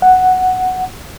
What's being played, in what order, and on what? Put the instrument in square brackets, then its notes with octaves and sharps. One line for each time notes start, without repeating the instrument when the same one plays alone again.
[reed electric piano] F#5